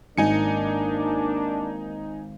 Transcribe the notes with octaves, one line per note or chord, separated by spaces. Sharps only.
G#1 A#3 D4 D#4 G#5 C#7